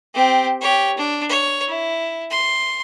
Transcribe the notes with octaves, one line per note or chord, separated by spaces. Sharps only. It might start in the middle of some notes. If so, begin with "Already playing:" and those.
C4 G4
G4 C#5
D4
C#5
E4
C6